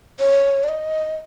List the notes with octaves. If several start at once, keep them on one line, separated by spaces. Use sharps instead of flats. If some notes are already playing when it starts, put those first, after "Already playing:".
C#5
D5
D#5